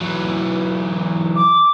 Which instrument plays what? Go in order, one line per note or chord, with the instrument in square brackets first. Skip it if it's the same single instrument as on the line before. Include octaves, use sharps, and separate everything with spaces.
[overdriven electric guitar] E3 F#3
[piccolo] D6